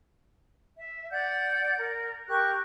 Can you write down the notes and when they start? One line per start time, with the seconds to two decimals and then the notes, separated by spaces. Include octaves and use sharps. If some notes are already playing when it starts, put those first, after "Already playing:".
0.77 E5
1.10 D5 F#5 G6
1.77 A#4
2.27 G4 A#4 C#6 F#6